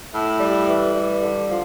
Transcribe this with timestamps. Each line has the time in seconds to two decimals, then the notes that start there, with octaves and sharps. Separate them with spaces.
0.13 A2
0.40 G3
0.67 E3
0.95 G3
1.22 D3
1.48 F3